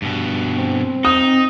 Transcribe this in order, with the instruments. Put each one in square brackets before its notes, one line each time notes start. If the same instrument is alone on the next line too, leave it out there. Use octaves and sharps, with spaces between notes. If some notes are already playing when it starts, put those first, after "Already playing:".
[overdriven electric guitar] G2 B2
[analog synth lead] C4
[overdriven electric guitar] D#4 [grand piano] D#6